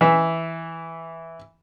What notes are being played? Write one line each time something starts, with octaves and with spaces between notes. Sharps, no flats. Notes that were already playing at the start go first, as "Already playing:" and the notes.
E3 E5